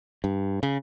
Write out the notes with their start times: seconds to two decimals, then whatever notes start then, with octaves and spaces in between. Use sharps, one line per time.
0.24 G2
0.63 C#3